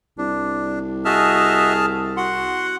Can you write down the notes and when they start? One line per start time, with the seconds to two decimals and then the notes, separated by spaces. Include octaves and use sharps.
0.18 C2 D4
1.05 F#4 G#4 D#5 E5 A5 F6
2.17 F#4 F#5 C6